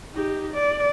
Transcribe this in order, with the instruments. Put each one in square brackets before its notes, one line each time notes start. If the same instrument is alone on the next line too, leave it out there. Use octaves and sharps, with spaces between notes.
[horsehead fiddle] D#4 G4
D5